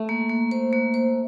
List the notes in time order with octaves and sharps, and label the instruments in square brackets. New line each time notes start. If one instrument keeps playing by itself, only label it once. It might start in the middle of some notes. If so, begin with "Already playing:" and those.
Already playing: [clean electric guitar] A3
[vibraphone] A#3
A#3
C5
A#3
C5